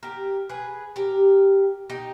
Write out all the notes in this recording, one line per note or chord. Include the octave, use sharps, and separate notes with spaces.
G4 A#4
G#4 B4
G4 A#4
D#4 G4